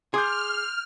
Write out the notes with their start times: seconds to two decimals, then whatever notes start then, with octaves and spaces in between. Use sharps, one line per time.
0.14 G#4 C6 D6 F6 G6